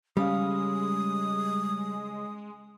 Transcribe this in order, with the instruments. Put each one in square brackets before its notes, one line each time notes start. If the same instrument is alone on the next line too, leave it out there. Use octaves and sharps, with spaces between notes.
[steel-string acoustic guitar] C#3 C#5 F5 [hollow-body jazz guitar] G3 [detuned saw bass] G#3 [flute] D#6